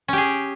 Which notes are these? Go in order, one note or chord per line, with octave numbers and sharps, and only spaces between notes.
C#4 G4 G#4